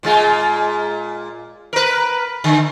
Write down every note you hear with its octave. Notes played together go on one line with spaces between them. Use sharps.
A#2 G#3 F4
A#4 B4
D3